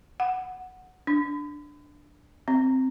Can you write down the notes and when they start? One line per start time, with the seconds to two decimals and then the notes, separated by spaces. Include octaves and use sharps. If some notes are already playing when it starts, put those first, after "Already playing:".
0.20 F#5
1.07 D4
2.48 C4